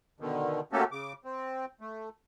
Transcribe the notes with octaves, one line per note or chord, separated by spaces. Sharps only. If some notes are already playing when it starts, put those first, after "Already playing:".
B2 D3 D#3
A3 A#3 C#4 F#4 G4 A4
C#3 D6
C4
A3